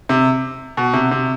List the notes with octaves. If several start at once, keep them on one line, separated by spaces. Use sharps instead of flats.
C3
B2
C3
C3